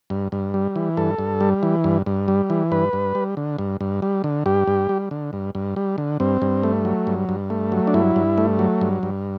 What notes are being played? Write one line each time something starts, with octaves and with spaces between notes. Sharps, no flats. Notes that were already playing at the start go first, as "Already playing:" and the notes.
G2
G2
G3
E3
G2 A4
G2
G3
E3
G2
G2
G3
E3
G2 B4
G2
G3
D3
G2
G2
G3
D3
G2 G4
G2
G3
D3
G2
G2
G3
D3
G2 C4
G2
A3
F#3
G2
G2
A3
F#3
D4
G2 E4
G2
A3
F#3
G2
G2